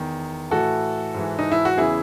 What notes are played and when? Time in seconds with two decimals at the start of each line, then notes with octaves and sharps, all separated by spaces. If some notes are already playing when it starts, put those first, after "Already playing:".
Already playing: E2 D#3
0.50 A2 E3 F#4 A4
1.14 G#2 E3
1.39 D#4
1.52 E4
1.65 F#4
1.77 E2 C#3 E3 E4 G#4